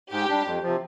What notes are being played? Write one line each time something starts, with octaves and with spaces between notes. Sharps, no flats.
G#2 G4
G3 D4
F2
C3 F3